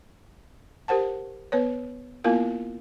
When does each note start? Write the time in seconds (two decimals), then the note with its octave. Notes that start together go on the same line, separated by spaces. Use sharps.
0.88 G4 A#4 C5 F#5 A5
1.52 B3 B4 C#5
2.24 A#3 B3 E4 F4 A#4 F5